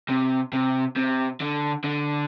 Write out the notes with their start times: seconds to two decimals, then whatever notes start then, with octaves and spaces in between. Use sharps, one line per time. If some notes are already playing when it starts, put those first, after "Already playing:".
0.09 C3
0.53 C3
0.96 C3
1.40 D3
1.84 D3